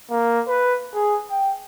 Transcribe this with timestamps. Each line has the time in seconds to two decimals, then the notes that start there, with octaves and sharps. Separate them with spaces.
0.11 A#3
0.48 B4
0.94 G#4
1.31 G5